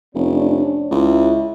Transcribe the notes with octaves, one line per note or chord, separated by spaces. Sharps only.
F1 C#4 D4
C#2 E4